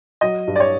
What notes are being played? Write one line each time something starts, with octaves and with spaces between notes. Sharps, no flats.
F#3 D#5
G2
D5
C#5